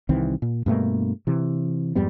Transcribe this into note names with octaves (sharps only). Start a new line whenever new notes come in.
C2 D#3 E3 C4
A#2
G2 B2 A3 A#3
C3 E3
F2 G#2 G3 B3